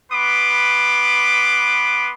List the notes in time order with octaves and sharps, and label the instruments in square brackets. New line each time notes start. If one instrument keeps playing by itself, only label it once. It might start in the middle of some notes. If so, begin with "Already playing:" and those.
[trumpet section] B3 B4 C6 D6